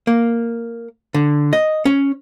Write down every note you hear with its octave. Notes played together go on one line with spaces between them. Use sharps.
A#3
D3
D#5
C#4